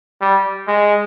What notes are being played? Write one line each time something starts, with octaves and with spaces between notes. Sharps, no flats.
G3
G#3